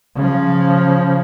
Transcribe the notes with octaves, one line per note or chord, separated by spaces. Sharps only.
C#3 F3